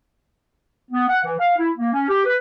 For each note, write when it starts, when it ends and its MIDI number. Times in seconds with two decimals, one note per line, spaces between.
0.91 1.07 59
1.08 1.19 78
1.24 1.34 52
1.39 1.53 77
1.57 1.70 64
1.77 1.91 58
1.92 2.05 61
2.09 2.24 67
2.25 2.37 71